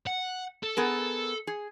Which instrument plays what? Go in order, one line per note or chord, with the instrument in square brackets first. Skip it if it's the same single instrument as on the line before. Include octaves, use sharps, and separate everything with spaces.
[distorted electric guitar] F#5
A4
[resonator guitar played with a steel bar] B3 G#4 A#4
G#4